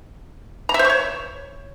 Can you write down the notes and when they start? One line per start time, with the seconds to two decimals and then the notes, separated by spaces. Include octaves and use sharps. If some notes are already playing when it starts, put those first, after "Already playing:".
0.69 A#5
0.74 E5
0.79 C5
0.84 C#6
0.90 C#5